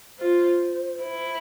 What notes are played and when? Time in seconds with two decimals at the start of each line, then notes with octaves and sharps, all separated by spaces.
0.19 F4 C5
1.02 E4